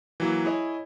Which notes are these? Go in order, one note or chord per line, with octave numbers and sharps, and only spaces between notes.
E3 F#3 A#3
E4 G#4 C#5 D#5